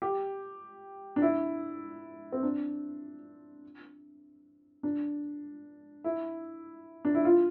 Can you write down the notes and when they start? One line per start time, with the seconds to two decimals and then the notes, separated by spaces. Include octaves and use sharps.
0.02 G4
1.16 D4
1.22 E4
2.32 C4
2.43 D4
4.83 D4
6.04 E4
7.05 D4
7.15 E4
7.25 F4